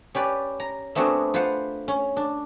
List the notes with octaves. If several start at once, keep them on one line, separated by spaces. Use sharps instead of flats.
C#4 G4 B4 D5
A#5
A3 B3 C4 D4 F#4 G#4
F4 B4 C5 F5 F#5
C#4
D4